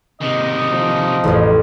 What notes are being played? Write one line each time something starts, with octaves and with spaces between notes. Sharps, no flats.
C3 D#3 D#4 D#5
F3
A1 F2